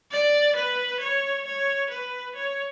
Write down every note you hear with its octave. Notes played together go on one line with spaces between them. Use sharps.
D5
B4
C#5
C#5
B4
C#5